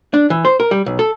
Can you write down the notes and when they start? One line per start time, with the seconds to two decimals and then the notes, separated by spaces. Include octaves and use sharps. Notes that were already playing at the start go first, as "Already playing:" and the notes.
0.14 D4
0.30 E3
0.45 C5
0.60 A#4
0.71 G3
0.86 B1
0.99 A4